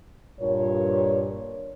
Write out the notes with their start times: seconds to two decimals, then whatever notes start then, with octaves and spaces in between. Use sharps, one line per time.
0.40 G2 A#2 C#5